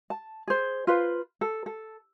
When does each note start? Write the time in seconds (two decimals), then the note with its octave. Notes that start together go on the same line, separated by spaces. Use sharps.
0.10 A5
0.47 G#4 C5
0.87 F4 B4 C5
1.41 A4
1.66 A4